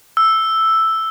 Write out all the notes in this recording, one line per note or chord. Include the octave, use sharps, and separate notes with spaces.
E6